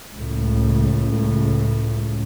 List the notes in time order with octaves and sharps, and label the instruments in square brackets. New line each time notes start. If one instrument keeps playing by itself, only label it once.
[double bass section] C#2 A2